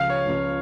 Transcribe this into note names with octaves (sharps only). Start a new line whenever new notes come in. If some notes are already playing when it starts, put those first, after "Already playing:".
Already playing: C#2 C#3 F3 F5
C#5
C#2 C#3 F3